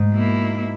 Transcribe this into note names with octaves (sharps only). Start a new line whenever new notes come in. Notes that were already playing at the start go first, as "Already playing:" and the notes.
Already playing: G#2
B2 A#3 E4